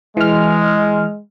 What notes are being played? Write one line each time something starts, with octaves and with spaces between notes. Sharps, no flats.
E3 G#3 F6